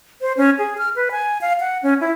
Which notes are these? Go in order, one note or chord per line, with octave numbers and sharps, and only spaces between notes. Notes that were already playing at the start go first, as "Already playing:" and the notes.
C5
C#4
G#4
F6
B4
G#5
F5
F#5
C#4
E4